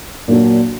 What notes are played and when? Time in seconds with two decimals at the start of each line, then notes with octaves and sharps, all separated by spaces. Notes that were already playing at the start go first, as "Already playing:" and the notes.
0.28 A#2 F#3 A#3 D4 F#4